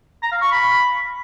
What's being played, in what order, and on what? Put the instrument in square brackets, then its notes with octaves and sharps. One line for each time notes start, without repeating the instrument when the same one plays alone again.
[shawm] A#5
F5
C#6
B5